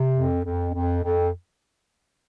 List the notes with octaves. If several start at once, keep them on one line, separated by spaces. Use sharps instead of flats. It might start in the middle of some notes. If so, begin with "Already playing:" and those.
Already playing: C3
F2
F2
F2
F2